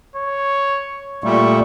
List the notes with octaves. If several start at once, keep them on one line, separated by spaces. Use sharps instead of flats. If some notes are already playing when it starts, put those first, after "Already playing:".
C#5
A#2 G3 A3 C#6